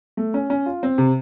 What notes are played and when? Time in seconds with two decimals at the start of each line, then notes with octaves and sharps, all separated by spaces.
0.17 A3
0.34 C#4
0.50 C#4
0.66 F4
0.83 C4
0.98 C3